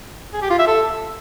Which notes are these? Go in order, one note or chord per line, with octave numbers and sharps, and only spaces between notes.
G#4
G4
F4
E5
A4